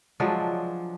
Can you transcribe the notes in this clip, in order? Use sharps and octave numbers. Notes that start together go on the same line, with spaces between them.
F3 F#3 G#3 D4